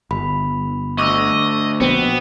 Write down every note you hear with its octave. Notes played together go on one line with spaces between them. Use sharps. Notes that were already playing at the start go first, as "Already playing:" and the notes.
G1 B5
D2 D#5 C#6 D6 E6
A#1 B2 B3 C4